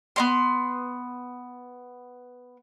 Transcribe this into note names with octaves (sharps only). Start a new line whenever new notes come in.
B3 C#4 C6